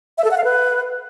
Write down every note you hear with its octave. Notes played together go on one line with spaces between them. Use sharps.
E5
A4
F#5
F5
B4